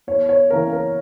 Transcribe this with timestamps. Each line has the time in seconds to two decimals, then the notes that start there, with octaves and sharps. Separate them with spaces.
0.07 E2 C#5
0.29 C#5
0.50 C#3 E3 A#3 C#4 A#4
0.73 A#4